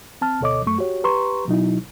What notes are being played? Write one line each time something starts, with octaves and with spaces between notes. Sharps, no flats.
C4 A5 F6
D2 B2 A4 C#5 D#5 D6
F#2 A3 C#6
F#4 G4 C#5
G4 B4 A#5 C6 C#6
B2 F#3 D#4 E4